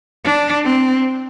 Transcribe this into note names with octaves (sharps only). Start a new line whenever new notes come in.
D4
C4